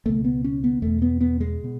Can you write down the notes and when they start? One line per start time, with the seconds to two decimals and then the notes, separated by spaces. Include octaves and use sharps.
0.06 C#2 B2 A3
0.24 B3
0.44 C#4
0.64 B3
0.82 E2 B2 A3
1.02 B3
1.21 B3
1.40 G#3
1.64 B2